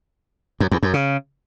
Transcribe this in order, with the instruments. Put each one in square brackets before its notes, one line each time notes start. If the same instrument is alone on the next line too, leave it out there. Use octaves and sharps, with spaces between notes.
[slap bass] F#2
E2
F#2
C#3